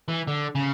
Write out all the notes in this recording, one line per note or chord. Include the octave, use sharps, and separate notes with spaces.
E3
D3
C#3